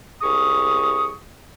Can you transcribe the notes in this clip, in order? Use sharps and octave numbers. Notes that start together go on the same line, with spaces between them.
C2 G#4 C#6 D#6